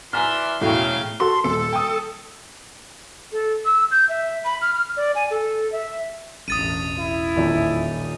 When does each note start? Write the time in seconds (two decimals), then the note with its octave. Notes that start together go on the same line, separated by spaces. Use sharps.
0.13 E3 D5 E5 G#5 A#5 C6 F6
0.61 E1 A2 C#3 F#3 F5 G5
1.20 F#4 A4 C6
1.45 D#1 A4
1.73 G5 D#6
3.32 A4
3.65 E6
3.91 G6
4.09 E5
4.45 B5
4.62 F6
4.74 F6
4.96 D5
5.15 G#5
5.31 A4
5.72 E5
6.48 E1 A1 D#6 A6 D#7
6.98 E4
7.36 D#1 A#1 D#4